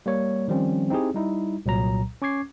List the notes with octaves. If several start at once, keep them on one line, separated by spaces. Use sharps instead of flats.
G3 A#3 C#5
D#3 F3 G3 C4 C#4
C4 D#4 E4 G4 G#4
G3 D#4 E4
C2 A#2 F#3 A#5
C#4 C#6 D6 G#6 C7